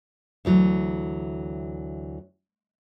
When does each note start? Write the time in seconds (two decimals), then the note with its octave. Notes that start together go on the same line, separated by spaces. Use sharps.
0.45 D2 E3 F#3